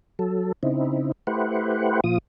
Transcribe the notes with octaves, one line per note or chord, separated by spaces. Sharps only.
F#3 A4
C#3 C4 D#4 E4
A3 E4 G4 B4 C5 F#5
A#2 F3 F4 D#6